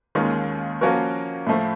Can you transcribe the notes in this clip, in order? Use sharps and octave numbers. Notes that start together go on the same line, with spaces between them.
D#2 D#3 G#3 C#4 F4
F3 A#3 C#4 F#4 A#4
A2 F3 A3